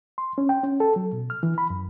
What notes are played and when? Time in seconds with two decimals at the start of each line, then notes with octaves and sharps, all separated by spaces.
0.18 C6
0.38 C#4
0.49 G5
0.63 C#4
0.80 A4
0.96 F#3
1.13 B2
1.30 F6
1.43 E3
1.58 B5
1.70 F#2